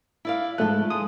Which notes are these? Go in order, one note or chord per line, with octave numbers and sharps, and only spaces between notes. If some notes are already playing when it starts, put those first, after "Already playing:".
E4 D5 F5
G#2 F3 A3 A4 F#6
G#3 D#6